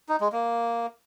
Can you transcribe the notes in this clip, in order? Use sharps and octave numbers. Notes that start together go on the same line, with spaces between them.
D#4
G#3
A#3